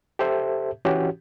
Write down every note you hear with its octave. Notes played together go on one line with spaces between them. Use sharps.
G4 A4 C5 E5
E3 C#4 F#4 G4